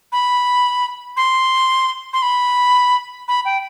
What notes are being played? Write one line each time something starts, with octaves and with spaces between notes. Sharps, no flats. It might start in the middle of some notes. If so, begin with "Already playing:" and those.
B5
C6
C6
B5
B5
G5